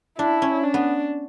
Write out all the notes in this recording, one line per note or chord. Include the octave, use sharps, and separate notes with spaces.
D4 E4
C#4
D4
B3